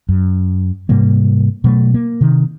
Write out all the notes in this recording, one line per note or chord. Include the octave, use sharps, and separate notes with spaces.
F#2
G#2 C3 G3 A#3
B2 F#3 A3
A#3
C3 D#3